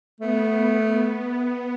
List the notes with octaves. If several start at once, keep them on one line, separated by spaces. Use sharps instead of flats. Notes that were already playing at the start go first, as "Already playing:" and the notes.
A3 B3